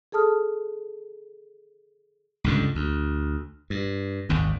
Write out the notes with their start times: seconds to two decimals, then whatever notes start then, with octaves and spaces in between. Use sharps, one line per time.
0.12 G#4 A4 A5 D#6 F6
2.44 C#2 G2 D3
2.75 D2
3.70 G2
4.29 G#1 D#2 G#2